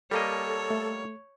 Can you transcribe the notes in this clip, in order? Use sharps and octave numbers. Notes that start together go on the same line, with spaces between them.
G3 A#3 A4 C#5 D#5
A3